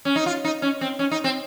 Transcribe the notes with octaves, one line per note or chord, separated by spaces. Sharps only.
C#4
D#4
F4
D#4
C#4
C4
C#4
D#4
C4